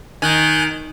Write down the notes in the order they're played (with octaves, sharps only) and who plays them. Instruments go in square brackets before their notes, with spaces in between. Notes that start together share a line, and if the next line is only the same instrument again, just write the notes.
[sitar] D#3 [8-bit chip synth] G#5 F#6 G6